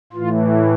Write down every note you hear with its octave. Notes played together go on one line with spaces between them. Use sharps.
A2 E3 F4